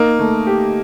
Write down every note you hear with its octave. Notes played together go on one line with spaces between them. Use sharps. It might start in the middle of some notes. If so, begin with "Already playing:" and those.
Already playing: A#3 D#4
A3
G4